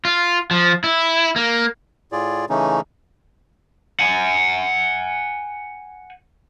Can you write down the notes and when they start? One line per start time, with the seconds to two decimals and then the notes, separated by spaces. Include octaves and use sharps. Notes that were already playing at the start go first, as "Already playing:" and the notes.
0.05 F4
0.51 F3
0.84 E4
1.36 A#3
2.12 A2 F4 G#4 D5
2.49 C#3 E3 A3 C#4 D#4
4.00 F#5 G#5